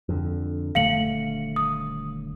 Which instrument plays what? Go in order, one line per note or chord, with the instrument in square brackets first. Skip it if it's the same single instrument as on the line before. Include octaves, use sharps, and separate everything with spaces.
[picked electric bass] F2 D3
[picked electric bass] D#1 D3 A3 [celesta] F5 C#7 F#7
[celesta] D#6